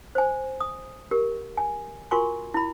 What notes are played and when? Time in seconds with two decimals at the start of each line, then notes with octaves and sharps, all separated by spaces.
0.15 C5 G#5
0.61 D#6
1.11 G4 A#4
1.57 G#5
2.11 F4 F#4 A#4 G#5 C6 C#6
2.54 E4 B5